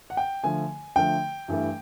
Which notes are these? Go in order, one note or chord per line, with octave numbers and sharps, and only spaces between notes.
F#5
G5
D3 F3 A3 G#5
D3 F3 A3 G5
G2 E3 A3